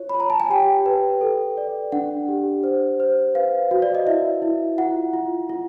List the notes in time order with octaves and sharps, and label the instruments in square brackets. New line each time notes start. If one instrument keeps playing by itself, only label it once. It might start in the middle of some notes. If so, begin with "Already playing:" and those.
Already playing: [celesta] F4 C#5
B5
C#5
A#5
A5
G#5
G4 G5
B4
A4
D5
D4 F#5
G4
C5
C5
B4 F5
F#4
D5
D#5
E4 E5
E4
F4 F#5
F4
F4